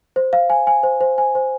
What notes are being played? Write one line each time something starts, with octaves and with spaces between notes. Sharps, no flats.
C5
F5
G#5
G#5
C5
C5
G#5
C5